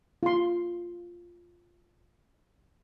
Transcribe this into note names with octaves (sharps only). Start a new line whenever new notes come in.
F4 C6